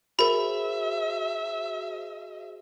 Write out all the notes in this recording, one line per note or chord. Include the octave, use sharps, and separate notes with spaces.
F#4 G#4 A#4 C5 E5 B5